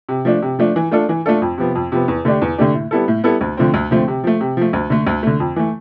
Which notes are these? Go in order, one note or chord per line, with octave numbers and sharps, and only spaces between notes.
C3
F3 A3 D4
C3
F3 A3 D4
E3
A3 D4 F4 A4
E3
A3 D4 F4 A4
F2
C3 F3 B3
F2
C3 F3 B3
E2
D3 A3 D4 G4
E2
D3 A3 D4 G4
A2
G3 B3 E4 A4
A2
G3 B3 E4 A4
D2
D3 F3 A3 C4
D2
D3 F3 A3 C4
C3
F3 A3
C3
F3 A3
D2
D3 A3
D2
D3 A3
F2
E3 A3